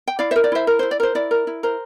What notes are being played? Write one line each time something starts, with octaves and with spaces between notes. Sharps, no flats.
G5
E4 D5 F5
A#4 C5 E5
D5
E4 C5 E5
A#4
E4 C5
D5
A#4 C5
E4 D5
A#4
E4
A#4 C5